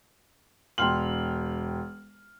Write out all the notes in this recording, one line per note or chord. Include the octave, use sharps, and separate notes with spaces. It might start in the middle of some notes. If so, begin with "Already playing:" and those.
E1 G5 C6 F6 F#7